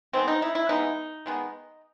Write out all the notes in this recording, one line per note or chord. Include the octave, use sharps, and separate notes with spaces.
D#3 G#3 B3 C4
D#4
E4
E4
E3 G#3 B3 D#4
D#3 G#3 B3